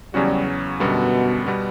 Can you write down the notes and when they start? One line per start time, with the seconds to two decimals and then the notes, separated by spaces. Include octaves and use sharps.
0.13 E2 C#3 F#3 G3 C#4 F#4
0.80 F#2 B2 D3 G3 B3 F#4
1.47 B2 G3 B3